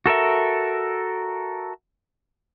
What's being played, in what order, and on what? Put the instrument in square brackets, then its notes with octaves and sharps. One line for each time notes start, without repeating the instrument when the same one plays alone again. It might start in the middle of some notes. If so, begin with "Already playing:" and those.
[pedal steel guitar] F#4 A4 A#4 E5